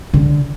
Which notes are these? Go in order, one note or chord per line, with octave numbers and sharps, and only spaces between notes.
D3